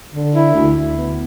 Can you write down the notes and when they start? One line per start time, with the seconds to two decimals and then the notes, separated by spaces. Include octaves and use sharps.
0.14 D3
0.35 E4
0.54 D2
0.75 D2
0.95 B3